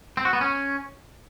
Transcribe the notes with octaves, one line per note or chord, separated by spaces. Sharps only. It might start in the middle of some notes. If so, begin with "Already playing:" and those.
C4
F#4
B3
C#4